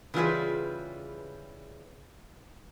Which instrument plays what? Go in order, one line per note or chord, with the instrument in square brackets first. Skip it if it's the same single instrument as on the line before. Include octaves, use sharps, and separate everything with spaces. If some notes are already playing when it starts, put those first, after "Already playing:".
[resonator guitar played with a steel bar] C#3 E3 G3 F4 G#4 B4